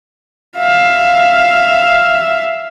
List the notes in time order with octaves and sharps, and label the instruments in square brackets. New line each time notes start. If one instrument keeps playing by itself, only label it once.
[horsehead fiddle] E5 F5